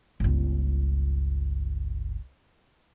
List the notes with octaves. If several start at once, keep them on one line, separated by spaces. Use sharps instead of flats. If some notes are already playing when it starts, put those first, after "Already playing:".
G1 C#2